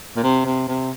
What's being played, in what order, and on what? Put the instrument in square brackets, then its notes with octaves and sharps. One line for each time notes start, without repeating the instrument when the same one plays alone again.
[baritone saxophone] A#2
C3
C3
C3